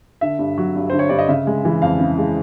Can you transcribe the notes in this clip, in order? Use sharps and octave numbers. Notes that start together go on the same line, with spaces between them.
D3 E5
G2
F#3
G2
D3 C5
C#5
G2 D5
D#5
C#3 E5
G#3
E3
F2 F5
C#3
G#3